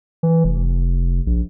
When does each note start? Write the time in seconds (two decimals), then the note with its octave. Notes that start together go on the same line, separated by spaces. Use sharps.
0.23 E3
0.44 F1
1.27 A#1